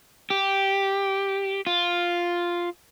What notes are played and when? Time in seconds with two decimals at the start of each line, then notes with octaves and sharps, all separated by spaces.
0.30 G4
1.67 F4